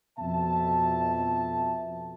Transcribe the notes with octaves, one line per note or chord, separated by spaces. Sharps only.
F2 B2 E5 A5